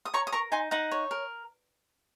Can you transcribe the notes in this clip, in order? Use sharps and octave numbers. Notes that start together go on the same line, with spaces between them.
D#6
C#5 A#5 C#6
D#6
A#4 A#5 C#6
D#4 G#5 C6
D#4 F#5 A#5
C#5
A#4